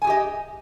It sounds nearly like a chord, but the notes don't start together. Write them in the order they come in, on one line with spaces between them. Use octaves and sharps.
G#5 G#4 G4 D#5